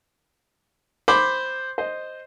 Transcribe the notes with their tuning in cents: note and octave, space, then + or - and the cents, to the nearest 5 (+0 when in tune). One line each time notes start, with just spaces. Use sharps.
C5 +0 B5 +5 D6 +0
C5 +0 D#5 -5